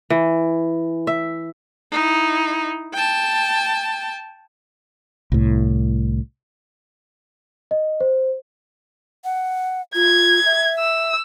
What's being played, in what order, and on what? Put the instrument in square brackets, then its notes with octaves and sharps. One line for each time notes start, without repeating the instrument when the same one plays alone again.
[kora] E3
E5
[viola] D#4 E4
G5 A5
[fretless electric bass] C2 A2
[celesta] D#5
C5
[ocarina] F#5
[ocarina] F4 [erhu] G#6
[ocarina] E5
[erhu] E6